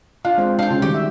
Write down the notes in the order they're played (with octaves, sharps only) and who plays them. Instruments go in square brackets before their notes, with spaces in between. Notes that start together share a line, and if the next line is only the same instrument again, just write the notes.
[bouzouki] D4 [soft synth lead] F4 [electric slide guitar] F5
[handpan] G#3 C4 C5
[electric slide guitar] D4 [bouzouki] F5 G5
[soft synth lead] C#3 [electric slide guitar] F4
[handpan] D#3 G3 [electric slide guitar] F#4 [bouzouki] G4
[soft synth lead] E5